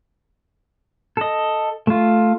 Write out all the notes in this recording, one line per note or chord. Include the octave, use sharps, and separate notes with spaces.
A4 D#5
A3 F4